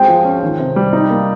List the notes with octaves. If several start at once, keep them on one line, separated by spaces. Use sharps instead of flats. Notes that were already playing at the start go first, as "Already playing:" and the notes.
Already playing: G#3 C4 G5
F3
C#4
D#3
C3
G3
D#4
A#3